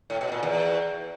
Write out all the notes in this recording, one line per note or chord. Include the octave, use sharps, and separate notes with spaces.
A2
B2
A#2
E2